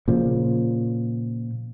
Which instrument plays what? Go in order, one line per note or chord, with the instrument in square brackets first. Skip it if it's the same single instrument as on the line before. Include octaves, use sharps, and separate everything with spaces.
[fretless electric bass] A#2 C#3 F3